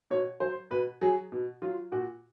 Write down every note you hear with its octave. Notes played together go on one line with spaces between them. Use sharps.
B2 C#5
F#3 C5
B2 B4
F#3 G#4
B2
F#3 F4
A#2 F#4